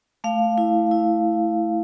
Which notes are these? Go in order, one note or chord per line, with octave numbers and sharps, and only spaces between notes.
A3 F5
E4
E4